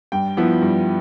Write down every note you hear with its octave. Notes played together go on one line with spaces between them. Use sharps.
G2 G5
F3 B3 E4
G2